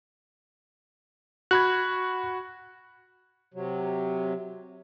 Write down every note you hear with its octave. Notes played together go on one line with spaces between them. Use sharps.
F#4 B5 F#6 G#6
C3 F#3